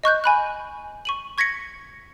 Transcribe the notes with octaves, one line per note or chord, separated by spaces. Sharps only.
D#5 C#6 F#6 G6
G#5 B5 F#6
C#6 D#7 F#7
C#6 G#6 A#6 B6 C#7